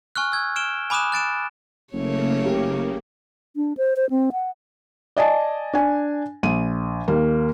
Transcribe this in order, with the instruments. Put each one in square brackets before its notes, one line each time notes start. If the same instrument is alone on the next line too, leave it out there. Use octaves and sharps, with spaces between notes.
[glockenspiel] G#5 C#6 F6 F#6
E6 G#6
F6 D7 E7 G7
G#5 B5 D6 D#6 F#6 E7
F#6 A6 D7 E7
[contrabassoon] F#1 [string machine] C#3 A#3 [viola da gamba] A3 C#5
[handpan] G4
[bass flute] D4
C5
C5
C4
F#5
[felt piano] D5 D#5 G#5 A5
D4 G#5
A#1 D#7
D#2 A#3